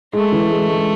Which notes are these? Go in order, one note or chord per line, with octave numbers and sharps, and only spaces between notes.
G#3 A3
E3
G#3
G#3